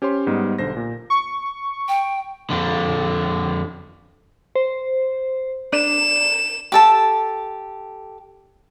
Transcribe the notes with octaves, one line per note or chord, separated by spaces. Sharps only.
C#4 G4 C5 C#5 C6
G#2 G3 B3 D#4
B1 D3 C5 A#6
A#2
C#6
G5
F2 D3
C5
D4 E7
G4 A4 A5